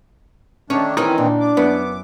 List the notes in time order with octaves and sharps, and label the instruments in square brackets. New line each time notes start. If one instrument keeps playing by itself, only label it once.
[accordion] D#3 A3 D4 [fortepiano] C#4 [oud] C#5
[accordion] D#3 E3 C4 [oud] C#4 E4 A#4 [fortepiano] D#4
[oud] A#2 [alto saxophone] D4
[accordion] D6
[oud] F#2 [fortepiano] B3